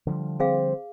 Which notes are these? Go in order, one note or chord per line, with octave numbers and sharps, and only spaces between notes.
D3 F3 G3
C4 G#4 F5